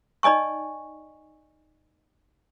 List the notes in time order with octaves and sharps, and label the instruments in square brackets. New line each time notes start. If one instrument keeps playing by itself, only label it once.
[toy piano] D#4 D5 D#5 G#5 C#6